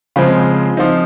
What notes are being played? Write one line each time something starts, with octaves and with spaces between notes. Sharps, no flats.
C#3 F3 G#3 C4
F3 C4 D#4